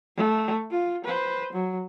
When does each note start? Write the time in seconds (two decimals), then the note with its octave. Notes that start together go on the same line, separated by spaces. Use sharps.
0.17 A3
0.71 F4
1.05 B4 C5
1.53 F#3